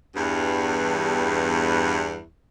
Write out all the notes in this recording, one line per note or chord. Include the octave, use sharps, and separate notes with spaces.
E2 G2